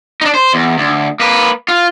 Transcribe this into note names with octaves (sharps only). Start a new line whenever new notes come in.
D4 D#4
C5
E2
D2
A#3 B4
F4